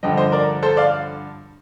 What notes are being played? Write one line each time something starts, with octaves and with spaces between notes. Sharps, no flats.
G2 D3 F3 D#5 G5
C5 D#5
A#4 D5
A4 C5
D5 F5